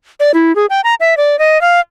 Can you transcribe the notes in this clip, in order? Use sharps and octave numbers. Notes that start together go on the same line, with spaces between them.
D5
E4
G#4
G5
A#5
E5
D5
D#5
F5